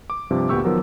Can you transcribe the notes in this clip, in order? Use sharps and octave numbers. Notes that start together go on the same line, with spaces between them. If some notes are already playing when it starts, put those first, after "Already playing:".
D6
G2 C3 F3
D2 A#2 B3 G4 C#6 E6
D#3 F3 F#3 B3 A#4